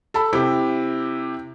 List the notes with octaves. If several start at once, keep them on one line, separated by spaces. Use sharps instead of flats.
A4 A5 B5
C3 E4 G4